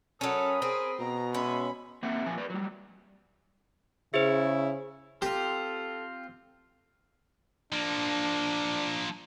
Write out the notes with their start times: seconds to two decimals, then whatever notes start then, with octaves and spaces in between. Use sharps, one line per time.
0.21 F#3 C#4 A4 A#4 B5 D#6
0.62 C4 G#4
0.99 B2 A#5
1.34 G#3 C#4 E5 B5 C6
2.03 A#3 C4 C5 E5 F#5
2.25 A#2 F3 G#5
2.38 B4 D5
2.50 F#3 G3
4.14 C#3 E4 G#4 C5
5.22 C4 F4 G4 A4
7.73 F3 A#3 D4